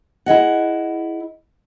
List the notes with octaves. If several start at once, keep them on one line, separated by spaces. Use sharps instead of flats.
E4 G#4 D#5 F#5